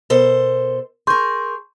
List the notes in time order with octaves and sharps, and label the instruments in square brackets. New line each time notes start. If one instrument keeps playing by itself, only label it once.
[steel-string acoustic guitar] B2 A4 C5 [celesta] A#4
[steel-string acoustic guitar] G#4 A#4 [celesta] C6 C#6 G6